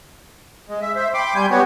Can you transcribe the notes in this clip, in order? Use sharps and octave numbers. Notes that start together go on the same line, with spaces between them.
G#3
E5
C5 E5
G5 B5 C6 D6
G3 G#5 G6
B3 F#4 G4 C#5